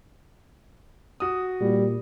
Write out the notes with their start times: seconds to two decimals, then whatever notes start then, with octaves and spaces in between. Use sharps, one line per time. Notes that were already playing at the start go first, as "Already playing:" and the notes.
1.20 F#4 D#6
1.61 A#2 G3